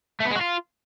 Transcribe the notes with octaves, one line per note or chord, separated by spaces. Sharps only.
A3
B3
G#3
F#4
F4